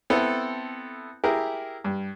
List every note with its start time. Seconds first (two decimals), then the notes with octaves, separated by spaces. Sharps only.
0.10 B3 C4 E4 A4
1.24 E4 G4 G#4 A#4
1.84 G2